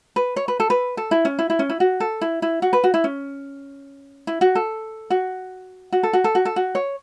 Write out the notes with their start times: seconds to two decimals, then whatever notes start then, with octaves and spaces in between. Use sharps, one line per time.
0.16 B4
0.36 C#5
0.48 B4
0.60 A4
0.70 B4
0.97 A4
1.11 E4
1.25 C#4
1.39 E4
1.50 E4
1.59 C#4
1.69 E4
1.80 F#4
2.00 A4
2.21 E4
2.42 E4
2.62 F#4
2.73 B4
2.84 F#4
2.94 E4
3.04 C#4
4.27 E4
4.41 F#4
4.55 A4
5.10 F#4
5.92 F#4
6.03 A4
6.13 F#4
6.24 A4
6.35 F#4
6.45 A4
6.56 F#4
6.75 C#5